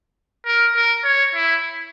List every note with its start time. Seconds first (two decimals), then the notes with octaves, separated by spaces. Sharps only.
0.46 A#4
0.75 A#4
1.04 C#5
1.34 E4